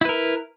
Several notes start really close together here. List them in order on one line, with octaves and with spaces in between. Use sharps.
E4 B4 A#4